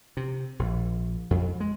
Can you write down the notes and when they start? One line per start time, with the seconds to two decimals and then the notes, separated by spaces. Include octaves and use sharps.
0.17 C3
0.59 A#1
1.31 F2
1.60 G#3